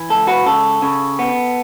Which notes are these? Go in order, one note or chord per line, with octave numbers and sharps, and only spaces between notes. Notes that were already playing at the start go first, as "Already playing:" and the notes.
Already playing: E3
C#2 A4
F#4 B4
C#3 A4
C#3
B3